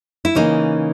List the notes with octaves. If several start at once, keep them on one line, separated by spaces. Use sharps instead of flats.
E4
C#3 E3 A#3 C#4 D#4